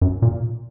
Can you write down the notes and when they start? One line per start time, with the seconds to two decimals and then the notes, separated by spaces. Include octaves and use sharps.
0.01 F#2
0.22 A#2